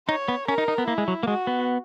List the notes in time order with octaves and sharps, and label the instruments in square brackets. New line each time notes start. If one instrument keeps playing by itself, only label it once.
[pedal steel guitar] D#4 [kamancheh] C#5
[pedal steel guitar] B3
[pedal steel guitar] C#4 [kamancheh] A#4
[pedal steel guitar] D#4
D#4
B3
[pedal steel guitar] A#3 [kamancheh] E4
[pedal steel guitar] G#3
F#3
A#3
[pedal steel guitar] G#3 [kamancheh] F#4
[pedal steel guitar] B3